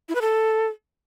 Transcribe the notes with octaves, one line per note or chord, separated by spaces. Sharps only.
E4
B4
A4